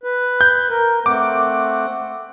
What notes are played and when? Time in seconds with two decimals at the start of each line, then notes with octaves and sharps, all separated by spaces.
0.03 B4
0.41 G6
0.70 A#4
1.06 A3 C4 F#5 D6